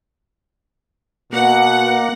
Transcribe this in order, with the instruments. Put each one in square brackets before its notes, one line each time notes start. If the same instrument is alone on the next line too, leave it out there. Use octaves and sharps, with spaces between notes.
[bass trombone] B2 [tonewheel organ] A#3 [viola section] F#5